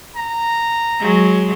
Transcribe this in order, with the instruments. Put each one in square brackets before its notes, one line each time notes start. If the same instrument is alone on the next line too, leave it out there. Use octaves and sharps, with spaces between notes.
[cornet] A#5
[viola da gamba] F#3 G#3